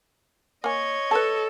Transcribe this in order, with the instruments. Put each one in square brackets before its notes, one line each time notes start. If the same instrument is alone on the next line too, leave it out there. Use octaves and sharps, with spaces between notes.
[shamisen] A#3 G#5 [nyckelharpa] C#5 D#5
[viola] A4 [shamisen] B4 A5